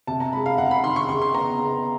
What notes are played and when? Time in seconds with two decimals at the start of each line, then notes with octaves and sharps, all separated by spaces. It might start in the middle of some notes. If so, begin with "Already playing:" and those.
0.07 C3 A5
0.20 A#5
0.33 G#3 B5
0.46 F5
0.58 C3 F#5
0.71 B5
0.83 D#3 C6
0.96 C#6
1.09 C#3 C6
1.22 C6
1.34 B3 A#5
1.59 C#3